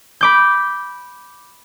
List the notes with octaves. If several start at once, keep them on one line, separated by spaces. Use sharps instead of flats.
B5 D6 G6